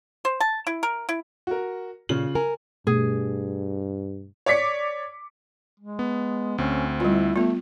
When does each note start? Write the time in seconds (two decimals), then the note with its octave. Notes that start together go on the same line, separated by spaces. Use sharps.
0.25 C5
0.40 A5
0.67 E4
0.83 A#4
1.09 E4
1.47 F#4 A#4
2.09 A#2 C#3 F4 F#7
2.35 A#4 G#5
2.87 G2 B2 A3 G#4
4.46 C#5 D5 D6 B6 C#7
5.80 G#3
5.99 B3
6.58 D2 C4 C#4
7.00 G3 E4 F4
7.36 A3 B3 F4